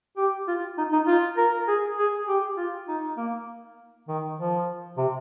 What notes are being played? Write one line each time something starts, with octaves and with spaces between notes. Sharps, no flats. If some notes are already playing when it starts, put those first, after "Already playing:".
G4
F4
D#4
D#4
F4
A#4
G#4
G#4
G4
F4
D#4
A#3
D#3
F3
C3